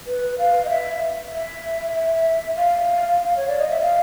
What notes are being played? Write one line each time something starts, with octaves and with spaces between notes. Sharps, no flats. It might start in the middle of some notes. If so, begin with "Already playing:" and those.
B4
F5
D#5
E5
E5
E5
F5
C#5
D5
D#5
E5
F5